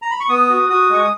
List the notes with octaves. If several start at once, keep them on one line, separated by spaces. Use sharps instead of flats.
A#5
B5
C#6
B3 D#6
F#4
F#4 D#6
G#3 C#6
D#6